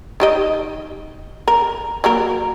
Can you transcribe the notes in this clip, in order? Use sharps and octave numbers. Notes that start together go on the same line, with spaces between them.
D#3 G4 D#5
A#4
F#3 A#3 A#4